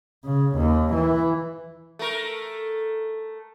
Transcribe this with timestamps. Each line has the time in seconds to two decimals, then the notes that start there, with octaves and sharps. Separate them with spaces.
0.25 C#3
0.57 D#2
0.94 E3
1.99 A3 A#4